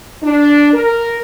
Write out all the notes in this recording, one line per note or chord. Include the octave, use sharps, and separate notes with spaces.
D4
A#4